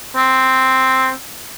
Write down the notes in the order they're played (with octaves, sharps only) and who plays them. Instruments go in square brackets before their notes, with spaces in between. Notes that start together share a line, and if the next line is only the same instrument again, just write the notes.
[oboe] C4